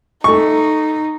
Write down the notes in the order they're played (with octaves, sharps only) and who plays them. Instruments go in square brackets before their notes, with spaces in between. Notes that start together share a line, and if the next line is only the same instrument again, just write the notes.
[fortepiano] A3 C#6 [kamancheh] D#4